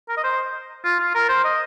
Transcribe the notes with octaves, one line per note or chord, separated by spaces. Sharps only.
A#4
D#5
C5
F4
F4
A#4
C5
D#5